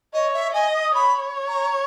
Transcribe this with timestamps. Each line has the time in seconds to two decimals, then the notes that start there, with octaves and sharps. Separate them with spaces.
0.14 C#5 D#5
0.34 E5
0.54 D#5 G#5
0.74 D#6
0.95 C#5 B5
1.48 A#5